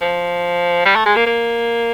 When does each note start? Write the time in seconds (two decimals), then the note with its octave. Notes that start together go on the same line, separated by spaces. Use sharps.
0.01 F3
0.85 G3
0.96 A3
1.06 G#3
1.16 A#3
1.26 A#3